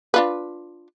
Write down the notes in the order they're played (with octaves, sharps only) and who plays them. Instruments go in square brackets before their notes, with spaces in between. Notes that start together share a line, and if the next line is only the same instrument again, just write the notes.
[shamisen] D4 F4 B4